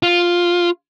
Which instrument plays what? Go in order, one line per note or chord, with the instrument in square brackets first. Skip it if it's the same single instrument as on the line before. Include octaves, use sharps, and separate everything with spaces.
[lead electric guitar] F4